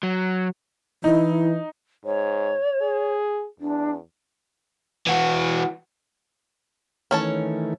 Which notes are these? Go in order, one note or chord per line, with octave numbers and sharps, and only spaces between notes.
F#3
E3 D#4 E4
G#2 C#5
G#4
E2 D4
E3 F#4
D#3 E3 A3 C#4 C#5 A5